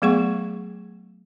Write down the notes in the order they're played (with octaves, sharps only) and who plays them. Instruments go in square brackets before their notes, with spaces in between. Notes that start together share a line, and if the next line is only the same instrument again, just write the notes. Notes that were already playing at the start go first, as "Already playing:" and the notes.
[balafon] F#3 A3 B3 G#4 F#5 C#6